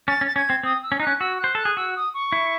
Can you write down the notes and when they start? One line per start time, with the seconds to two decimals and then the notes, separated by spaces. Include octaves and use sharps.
0.08 C#4 A6
0.21 C#4
0.27 A6
0.36 C#4 G#6
0.50 C4
0.63 C4 D#6
0.83 E6
0.92 C#4
1.00 D#4 F#6
1.07 C#4
1.20 F#4 E6
1.39 C5 F#6
1.55 A4 F#6
1.65 G#4
1.77 F#4 E6
1.96 D#6
2.14 C#6
2.32 E4